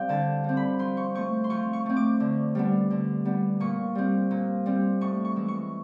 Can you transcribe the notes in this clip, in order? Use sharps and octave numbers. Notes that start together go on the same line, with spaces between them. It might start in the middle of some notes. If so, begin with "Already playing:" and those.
Already playing: G3 C4 F5 G5
D3 A5
G3 C4
B5
F3 C6
C#6
A3 C4 C#6
C6
F3 C#6
C#6
A3 C4
D6
D3
G3 B3 D4
D3
G3 B3 D4
A#2 C#6
G3 C4
A#2
G3 C4
A2 C#6
C#6
E3 G#3
C#6